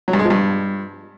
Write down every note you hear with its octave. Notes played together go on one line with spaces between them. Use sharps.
F#3
G2
G#3
F3
G2